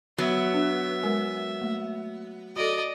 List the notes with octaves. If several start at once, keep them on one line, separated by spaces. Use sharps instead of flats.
F#3 B3 E5
D4
G#3 A#4 G#5
A3 A#3
F#4 A4 D5 D#5